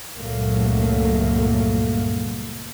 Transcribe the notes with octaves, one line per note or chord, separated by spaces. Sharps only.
C#2 G2 A#2 F#3 A3 A#3